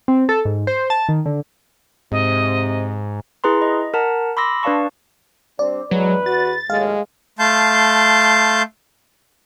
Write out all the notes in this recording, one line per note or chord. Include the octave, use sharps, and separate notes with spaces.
C4
A4
G#2
C5
A5
D#3
D3
G#2 C3 D#5
E4 G#4 B4 A#5 C6
D#5
A#4 F#5 A5 A#5
B5 C6 D6 E6 A#6
D4 B4 D5 F5 A5 C#6
G3 C4 D4 D5
E2 F#3 G#3 B4
F#4 A6
D#2 A2 F#3 G#3 F5
A3 F5 A5 C6 G6